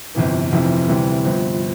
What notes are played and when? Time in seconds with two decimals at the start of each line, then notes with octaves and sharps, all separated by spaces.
0.15 G1 F2 C3 E3
0.52 F1 F2 C3 E3
0.88 D2 C3 E3 G3
1.25 G1 G2 F3 C4